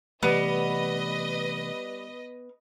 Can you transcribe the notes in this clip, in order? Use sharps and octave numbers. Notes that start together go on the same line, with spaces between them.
C3 E3 G3 A3 B3 B4 D#5